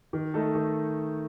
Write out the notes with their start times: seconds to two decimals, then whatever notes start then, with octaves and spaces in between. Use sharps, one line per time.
0.13 D#3
0.34 A3 D#4 A4
0.55 D#3